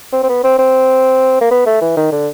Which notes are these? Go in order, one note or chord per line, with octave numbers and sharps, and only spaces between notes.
C4
C4
B3
C4
C4
A#3
B3
A3
E3
D#3
D3